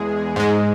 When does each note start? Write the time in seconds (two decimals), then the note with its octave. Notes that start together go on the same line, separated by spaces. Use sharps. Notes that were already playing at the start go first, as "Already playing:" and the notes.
Already playing: E2 G#3 G#4
0.36 G#2 G#3